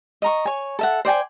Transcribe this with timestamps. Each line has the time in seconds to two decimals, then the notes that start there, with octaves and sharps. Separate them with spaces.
0.22 D#5 A#5 C#6
0.45 C#5 G#5
0.79 A4 E5 F#5
1.05 C5 D5 G5 G#5